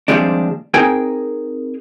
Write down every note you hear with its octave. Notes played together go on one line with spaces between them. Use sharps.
D#2 C3 F3 G3 G#3 D4
C4 D#4 G#4 A#4 G5 G#5